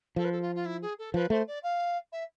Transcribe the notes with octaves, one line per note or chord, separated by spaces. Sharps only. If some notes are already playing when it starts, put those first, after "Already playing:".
F3 A4
B4
A4
F4
F4
E4
G#4
A4
F3 B4
A3 C5
D5
F5
E5